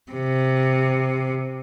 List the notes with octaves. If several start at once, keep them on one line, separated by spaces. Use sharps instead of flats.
C3